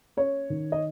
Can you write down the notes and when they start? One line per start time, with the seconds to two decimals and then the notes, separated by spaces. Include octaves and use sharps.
0.17 C#4 C#5
0.50 D#3
0.72 D#5